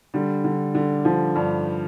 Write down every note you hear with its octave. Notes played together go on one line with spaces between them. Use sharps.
D3 G3
D3
D3
D3 F3
G2